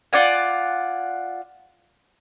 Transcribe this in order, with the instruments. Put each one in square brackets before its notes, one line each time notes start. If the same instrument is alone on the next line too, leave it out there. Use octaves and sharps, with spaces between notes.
[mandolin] F4 D5 F#5 G#5